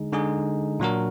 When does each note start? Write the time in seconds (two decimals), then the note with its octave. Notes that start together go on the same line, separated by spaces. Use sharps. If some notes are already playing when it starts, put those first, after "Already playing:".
Already playing: D3 G#3 D#4 G#4
0.13 D3 G#3 D#4 G#4
0.79 A#2 F#3 D4 F#4 A#4